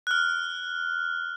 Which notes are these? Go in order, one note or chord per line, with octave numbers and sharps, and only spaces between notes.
F6 F#6